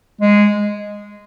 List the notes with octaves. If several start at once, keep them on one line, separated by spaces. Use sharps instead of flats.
G#3